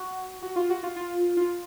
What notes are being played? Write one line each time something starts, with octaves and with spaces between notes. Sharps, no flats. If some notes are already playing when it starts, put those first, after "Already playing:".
Already playing: F#4
F#4
F4
F#4
F4
F4
F4